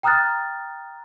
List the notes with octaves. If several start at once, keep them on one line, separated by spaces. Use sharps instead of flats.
G5 A#5 D#6 F6 F#6 A6